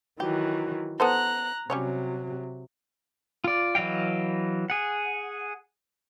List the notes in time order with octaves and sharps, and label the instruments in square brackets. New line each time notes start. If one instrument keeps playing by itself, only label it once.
[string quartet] D#3 E3 F#3 [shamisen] G4
[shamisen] B3 A4 C5 [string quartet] A#5 F#6
[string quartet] C3 F#3 [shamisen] G3 C#4 C#5
[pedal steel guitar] F4 D5
E3 F#3 D#5 F5 G5
G#4 F#5